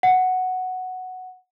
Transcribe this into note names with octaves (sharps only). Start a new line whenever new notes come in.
F#5